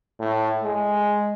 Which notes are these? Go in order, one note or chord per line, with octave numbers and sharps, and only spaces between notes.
A2
G#3